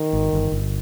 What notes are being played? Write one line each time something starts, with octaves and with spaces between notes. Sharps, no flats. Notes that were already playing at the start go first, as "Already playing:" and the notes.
Already playing: D#3
G#1
G1
G1